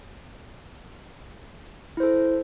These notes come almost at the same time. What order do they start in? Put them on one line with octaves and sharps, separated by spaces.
E4 C5 A4